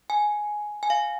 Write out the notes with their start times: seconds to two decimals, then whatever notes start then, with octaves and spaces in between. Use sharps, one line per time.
0.10 G#5
0.83 G#5
0.90 F5